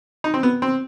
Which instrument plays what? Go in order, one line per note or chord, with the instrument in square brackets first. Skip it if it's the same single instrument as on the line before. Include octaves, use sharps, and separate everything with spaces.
[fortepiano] D#4
C4
B3
C4